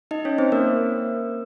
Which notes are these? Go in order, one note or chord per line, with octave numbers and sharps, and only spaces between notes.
D#4 D#5
C#4 C#5
C4 C5
A#3 A#4